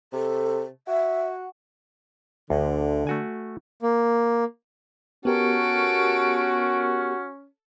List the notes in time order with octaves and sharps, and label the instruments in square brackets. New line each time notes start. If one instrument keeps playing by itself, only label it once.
[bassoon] C3 [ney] A4
[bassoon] F#4 [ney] E5
[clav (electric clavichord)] D2 [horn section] D3
[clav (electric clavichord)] A3 F#4 G#5
[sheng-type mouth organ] A#3
[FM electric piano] B3 G4 A#4 [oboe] C#4 [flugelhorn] F#4 [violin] A4 D7